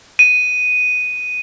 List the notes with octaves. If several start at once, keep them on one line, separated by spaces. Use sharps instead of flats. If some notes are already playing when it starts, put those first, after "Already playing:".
D#7